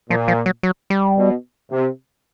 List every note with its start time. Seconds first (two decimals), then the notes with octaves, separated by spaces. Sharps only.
0.10 A#2 F3
0.28 F3
0.46 F#3
0.63 F#3
0.90 G3
1.17 B2
1.71 C3